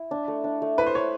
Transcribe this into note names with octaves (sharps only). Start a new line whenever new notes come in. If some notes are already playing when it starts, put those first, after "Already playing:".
Already playing: E4
D4
A3
D4
A3
E4 B4
C5
B4 C#5